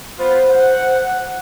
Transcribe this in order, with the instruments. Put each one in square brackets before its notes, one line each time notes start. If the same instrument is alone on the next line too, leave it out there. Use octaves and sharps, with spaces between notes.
[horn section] B3 F4 B4 [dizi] C5
[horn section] F#5